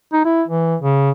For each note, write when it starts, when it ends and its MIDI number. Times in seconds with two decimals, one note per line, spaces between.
0.13 0.22 63
0.25 0.43 64
0.48 0.76 52
0.82 1.11 49